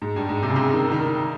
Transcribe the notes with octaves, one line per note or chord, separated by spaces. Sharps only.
G#2
G2
G#2
C3
C#3
C3
D#3
D#3